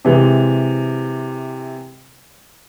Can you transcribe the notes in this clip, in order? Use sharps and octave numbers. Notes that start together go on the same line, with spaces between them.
C3 E3 G#3